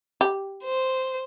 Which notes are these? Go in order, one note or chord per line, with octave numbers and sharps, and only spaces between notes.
G4
C5